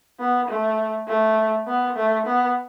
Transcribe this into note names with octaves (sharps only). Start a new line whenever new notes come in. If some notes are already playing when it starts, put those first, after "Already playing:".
B3
A3
A3
B3
A3
B3